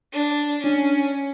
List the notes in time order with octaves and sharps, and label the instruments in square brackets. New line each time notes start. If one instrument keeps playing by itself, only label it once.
[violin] D4
[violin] C#4 [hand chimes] D4